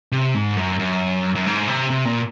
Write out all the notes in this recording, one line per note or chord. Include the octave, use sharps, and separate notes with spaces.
C3
G#2
F#2
F#2
F#2
G#2
C3
C3
A#2